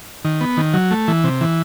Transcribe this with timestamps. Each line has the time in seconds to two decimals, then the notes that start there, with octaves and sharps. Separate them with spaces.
0.25 D#3
0.41 B3
0.57 D#3
0.74 F#3
0.91 A3
1.08 E3
1.24 C3
1.41 E3